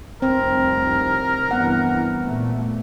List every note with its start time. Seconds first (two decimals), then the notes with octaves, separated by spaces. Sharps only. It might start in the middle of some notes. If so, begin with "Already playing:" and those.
0.22 F1 C2 C4 A#4
1.51 G2 E3 B3 F#5
2.24 A#2 A3